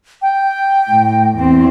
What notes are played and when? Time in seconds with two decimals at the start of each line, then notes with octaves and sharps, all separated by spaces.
0.22 G5
0.89 A2
1.37 E2 C4